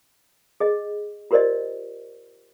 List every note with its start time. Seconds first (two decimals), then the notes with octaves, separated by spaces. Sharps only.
0.60 G#4 D#5
1.31 F4 G4 A#4 C5 D5 D#5